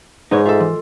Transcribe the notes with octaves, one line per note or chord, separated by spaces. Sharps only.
G#2 G#3 D#4 B4 C#5
F4 A4 E5
E3